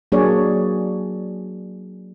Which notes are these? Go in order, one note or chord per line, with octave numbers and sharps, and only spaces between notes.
F#3 A#3 D4 G#4 C#5 D5